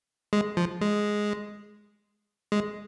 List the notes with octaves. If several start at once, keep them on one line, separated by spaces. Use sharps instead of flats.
G#3
F3
G#3
G#3